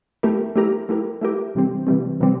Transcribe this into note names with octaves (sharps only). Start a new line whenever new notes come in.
A3 E4 G4 A#4
A3 E4 G4 A#4
A3 E4 G4 A#4
A3 E4 G4 A#4
C3 E3 G3 C4
C3 E3 G3 C4
C3 E3 G3 C4